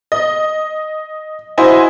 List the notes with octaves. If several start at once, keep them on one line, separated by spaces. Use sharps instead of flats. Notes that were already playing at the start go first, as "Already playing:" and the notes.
D#5
E4 F#4 C5 D#5 G#5